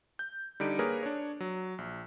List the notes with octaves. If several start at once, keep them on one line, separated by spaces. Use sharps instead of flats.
G6
D3 G3 D#4 D7
A#3 G#4 A#4 B4 C#5
D4 C#5
F#3
A#1